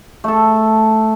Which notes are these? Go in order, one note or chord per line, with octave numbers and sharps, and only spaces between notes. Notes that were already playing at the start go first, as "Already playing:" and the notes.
A3 A4